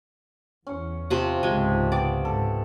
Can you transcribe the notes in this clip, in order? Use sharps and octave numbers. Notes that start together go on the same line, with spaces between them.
E2 C#4 C#5
C3 F3 F#5
C#2 G#2 G#3
B3 G4 D5
G#2 A4